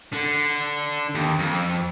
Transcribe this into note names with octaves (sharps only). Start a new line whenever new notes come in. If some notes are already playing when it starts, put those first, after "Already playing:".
D3
D#2
F2